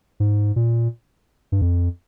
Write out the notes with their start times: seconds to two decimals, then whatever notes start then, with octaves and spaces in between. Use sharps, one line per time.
0.20 G#2
0.56 A#2
1.52 G2
1.62 F2